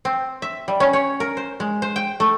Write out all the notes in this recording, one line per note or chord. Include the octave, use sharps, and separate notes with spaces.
C4
E5
G3
C#4
C#5
A#4
C5
G#3
C5
G5
A3